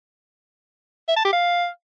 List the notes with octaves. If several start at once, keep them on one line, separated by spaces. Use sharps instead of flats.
E5
A5
G4
F5